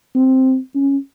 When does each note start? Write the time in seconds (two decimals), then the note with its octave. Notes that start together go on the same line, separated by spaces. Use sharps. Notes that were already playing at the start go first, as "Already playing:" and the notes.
0.15 C4
0.75 C#4